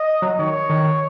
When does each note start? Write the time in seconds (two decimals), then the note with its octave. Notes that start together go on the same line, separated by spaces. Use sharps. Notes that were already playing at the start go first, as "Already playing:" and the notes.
Already playing: D#5
0.22 F#3
0.38 D#3 C#5
0.69 D#3